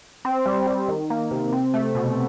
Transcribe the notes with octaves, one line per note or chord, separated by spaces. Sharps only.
C4
G3
G3
D#3
A#3
C3
C4
A3
B2